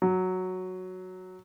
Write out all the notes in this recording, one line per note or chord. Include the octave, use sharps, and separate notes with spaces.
F#3